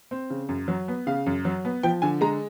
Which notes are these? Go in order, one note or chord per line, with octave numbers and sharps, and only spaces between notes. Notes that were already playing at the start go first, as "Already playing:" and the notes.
C4
C#3
F#2
F#3
B3
C#3 F5
F#2
F#3
B3
F3 G5
D3 G#5
G#3 A#5